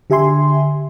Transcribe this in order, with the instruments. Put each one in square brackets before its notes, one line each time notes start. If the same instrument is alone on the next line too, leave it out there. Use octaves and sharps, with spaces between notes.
[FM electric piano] D3 G4 E5 G#5 C6